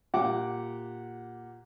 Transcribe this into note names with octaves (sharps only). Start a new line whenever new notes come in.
A#2 G4 F#5 D6